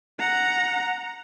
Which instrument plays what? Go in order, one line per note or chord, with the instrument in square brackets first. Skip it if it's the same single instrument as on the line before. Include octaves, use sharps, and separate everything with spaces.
[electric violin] F#5 A#5